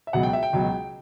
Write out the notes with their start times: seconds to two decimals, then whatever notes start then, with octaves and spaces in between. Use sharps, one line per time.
0.07 E5
0.13 C#2 B2 F#3 F#5
0.23 G5
0.33 E5
0.43 G5
0.53 C#2 B2 F#3